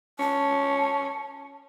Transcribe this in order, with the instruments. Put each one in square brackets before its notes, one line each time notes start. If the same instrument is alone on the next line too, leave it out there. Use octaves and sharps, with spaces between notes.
[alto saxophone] C#4 [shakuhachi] A5